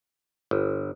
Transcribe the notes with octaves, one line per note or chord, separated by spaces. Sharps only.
G1